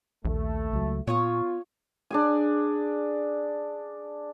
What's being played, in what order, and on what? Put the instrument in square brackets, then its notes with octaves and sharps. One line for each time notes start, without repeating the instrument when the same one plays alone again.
[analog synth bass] A#1 [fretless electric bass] D#2 [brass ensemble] A3
[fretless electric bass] C#2 F#3
[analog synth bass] A#2 [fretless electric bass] B3 [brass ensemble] F4 [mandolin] C#5 C#6 D#6
[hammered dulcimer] D4 G#4 G#5